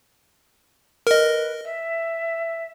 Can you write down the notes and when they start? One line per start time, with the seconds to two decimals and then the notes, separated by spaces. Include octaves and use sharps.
1.07 A#4 B4 D#5
1.64 E5